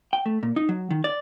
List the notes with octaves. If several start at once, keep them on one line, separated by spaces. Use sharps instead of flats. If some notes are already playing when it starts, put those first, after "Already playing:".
G5
A3
A#2
D#4
F#3
D#3
D5